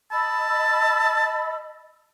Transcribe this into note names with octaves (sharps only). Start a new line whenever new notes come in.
D#5 A5 B5 E6